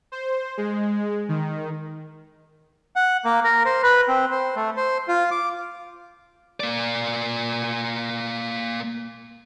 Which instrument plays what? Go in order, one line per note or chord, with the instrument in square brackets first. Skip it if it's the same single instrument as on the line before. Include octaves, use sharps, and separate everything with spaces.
[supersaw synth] C5
G#3
D#3
[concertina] F#5
A#3
A#4
C5
B4
C4
C5
A3
C5
F4
D6
[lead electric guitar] A#3 D5